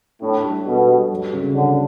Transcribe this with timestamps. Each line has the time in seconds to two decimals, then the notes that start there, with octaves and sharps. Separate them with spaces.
0.22 A2 D4
0.43 G3
0.66 B2 A4
0.88 G3
1.10 F#3
1.33 C#3
1.55 D3 C#4